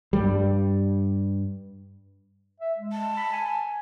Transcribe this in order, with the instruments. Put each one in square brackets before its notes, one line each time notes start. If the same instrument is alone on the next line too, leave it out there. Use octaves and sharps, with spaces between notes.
[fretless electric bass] G2 G3
[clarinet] E5
G#3
[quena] A5
[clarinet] B5
G#5